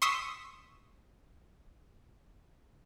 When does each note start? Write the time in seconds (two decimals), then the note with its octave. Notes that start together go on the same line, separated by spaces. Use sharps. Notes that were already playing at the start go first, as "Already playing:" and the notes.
0.02 C6 C#6 D#6 E6 B6